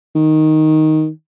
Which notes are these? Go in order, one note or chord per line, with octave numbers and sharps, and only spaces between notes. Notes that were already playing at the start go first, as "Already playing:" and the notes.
D#3